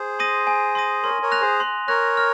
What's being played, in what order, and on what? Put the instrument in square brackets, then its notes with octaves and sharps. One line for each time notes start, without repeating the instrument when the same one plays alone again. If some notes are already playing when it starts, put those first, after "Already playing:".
Already playing: [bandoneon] G#4 C5
[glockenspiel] C6 D#6 A#6 D#7
G#5
C6 D#6 A#6 D#7
[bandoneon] A#4 C#5 [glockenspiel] C6
[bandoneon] A#4 C#5
[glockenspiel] F#6 A#6 F7
[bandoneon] G#4 C5
[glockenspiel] C6
[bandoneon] A#4 C#5 [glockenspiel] F#6 A#6 F7
[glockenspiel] F6